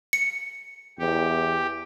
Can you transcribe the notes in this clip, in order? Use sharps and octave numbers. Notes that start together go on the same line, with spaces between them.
C#7
E2 G4